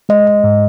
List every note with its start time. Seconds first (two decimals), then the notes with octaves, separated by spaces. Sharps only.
0.09 G#3 D#5
0.27 D#5
0.44 G#2